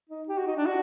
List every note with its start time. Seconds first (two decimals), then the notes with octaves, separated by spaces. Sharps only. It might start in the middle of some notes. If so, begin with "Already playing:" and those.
0.09 D#4
0.28 G4
0.38 F#4
0.47 D#4
0.56 D4
0.66 F#4